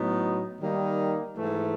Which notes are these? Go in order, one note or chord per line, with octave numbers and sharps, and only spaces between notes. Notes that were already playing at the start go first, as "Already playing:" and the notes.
Already playing: A2 F#3 B3 D#4
D#3 G3 A#3 D#4
G#2 E3 A3